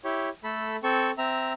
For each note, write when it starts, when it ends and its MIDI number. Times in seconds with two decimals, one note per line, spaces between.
0.04 0.29 64
0.04 0.29 67
0.04 0.29 73
0.44 0.76 57
0.44 0.76 69
0.44 0.76 83
0.83 1.11 60
0.83 1.11 69
0.83 1.11 85
1.18 1.53 60
1.18 1.53 76
1.18 1.53 82